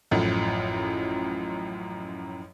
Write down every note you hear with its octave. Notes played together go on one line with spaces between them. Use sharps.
A1 F#2 A2 F3